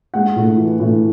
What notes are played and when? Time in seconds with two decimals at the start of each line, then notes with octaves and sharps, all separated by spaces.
0.14 G#3 F#5
0.36 A2
0.57 E3
0.80 A2